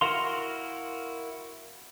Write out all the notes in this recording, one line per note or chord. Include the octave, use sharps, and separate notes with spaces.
E4 F#4 A#4 F5 C6